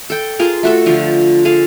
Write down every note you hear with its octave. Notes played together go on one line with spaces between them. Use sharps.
A4 G5
F4 G#4 A#4
A3 F#4 A4
D3 F3 F4
G#4 A4 F5